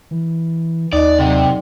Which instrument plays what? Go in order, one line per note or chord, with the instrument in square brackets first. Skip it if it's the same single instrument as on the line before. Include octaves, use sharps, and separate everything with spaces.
[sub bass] E3
[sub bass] D#2 [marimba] D#4 D#5 [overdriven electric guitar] D5
[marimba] A2 F#3 D5 [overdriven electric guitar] C3